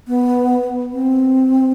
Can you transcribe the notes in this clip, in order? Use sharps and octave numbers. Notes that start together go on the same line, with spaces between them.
B3
C4